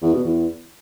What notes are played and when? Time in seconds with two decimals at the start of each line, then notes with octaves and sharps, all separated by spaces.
0.02 E2
0.13 B2
0.25 E2